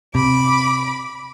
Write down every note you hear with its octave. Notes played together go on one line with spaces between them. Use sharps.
C3 B5 D6